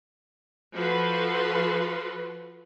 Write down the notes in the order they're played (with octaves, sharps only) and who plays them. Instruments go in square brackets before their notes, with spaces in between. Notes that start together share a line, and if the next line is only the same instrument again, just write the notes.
[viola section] F3 F#4 A4 B4 C6